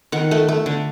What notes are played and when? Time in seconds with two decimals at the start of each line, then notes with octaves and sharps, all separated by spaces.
0.12 D#3 F#5
0.31 A3
0.49 A3
0.66 D3